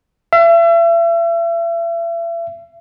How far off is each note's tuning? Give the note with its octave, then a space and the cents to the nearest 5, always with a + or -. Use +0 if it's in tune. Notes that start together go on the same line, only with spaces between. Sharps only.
E5 +35